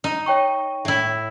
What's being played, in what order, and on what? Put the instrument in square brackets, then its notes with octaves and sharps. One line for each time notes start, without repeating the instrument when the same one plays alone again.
[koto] D#4
[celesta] C#5 G5 C#6
[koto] A2 E4